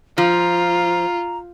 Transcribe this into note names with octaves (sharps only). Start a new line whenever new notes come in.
F3 F4 A#5